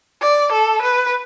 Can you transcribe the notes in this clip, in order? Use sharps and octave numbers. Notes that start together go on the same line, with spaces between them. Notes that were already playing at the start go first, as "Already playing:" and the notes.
D5
A4
B4